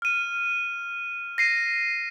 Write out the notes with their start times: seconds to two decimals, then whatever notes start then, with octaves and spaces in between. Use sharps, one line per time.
0.02 F6 D#7
1.38 A#6 C7 D#7